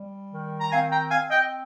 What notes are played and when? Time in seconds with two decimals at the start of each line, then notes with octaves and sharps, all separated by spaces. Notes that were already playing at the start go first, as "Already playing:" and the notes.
Already playing: G3
0.32 D#3
0.60 A#5
0.71 C4 F5 G#5
0.91 G5 A#5
1.11 C4 F5 G#5
1.30 D#5 G5